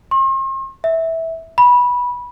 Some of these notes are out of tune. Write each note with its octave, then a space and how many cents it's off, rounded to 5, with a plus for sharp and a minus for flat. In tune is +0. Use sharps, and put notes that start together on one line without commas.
C6 +45
E5 -15
B5 -15